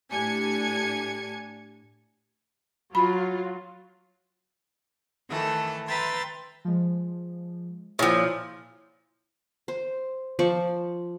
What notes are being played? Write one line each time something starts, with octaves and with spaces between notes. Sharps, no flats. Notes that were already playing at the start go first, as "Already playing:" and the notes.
A2 D4 G4 G#5 G#6 C#7
F#3 F4 B5
D#3 E3 A3 A4
B4 E5 G5 A#5 C6 A6
F3 G#3
A#2 F3 E4 C#5
C5
F3 C5 D5 C#6